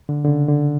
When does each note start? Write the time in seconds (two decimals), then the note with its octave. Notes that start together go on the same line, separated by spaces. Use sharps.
0.09 D3
0.25 D3
0.28 C#3
0.48 D3